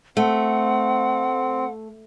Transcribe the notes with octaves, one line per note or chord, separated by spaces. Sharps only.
A3 C4 F#5